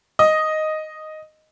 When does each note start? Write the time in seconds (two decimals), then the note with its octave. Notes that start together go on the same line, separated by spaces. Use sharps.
0.19 D#5